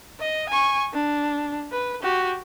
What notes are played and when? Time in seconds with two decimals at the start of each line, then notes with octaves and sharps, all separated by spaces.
0.20 D#5
0.50 G#5 C#6
0.94 D4
1.72 B4
2.03 F#4 G4